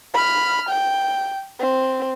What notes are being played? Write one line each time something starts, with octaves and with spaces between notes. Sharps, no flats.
B5 F6
G5
C4